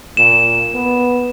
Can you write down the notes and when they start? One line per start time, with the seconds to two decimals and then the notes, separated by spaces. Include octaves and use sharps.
0.17 A#2 E7
0.74 B3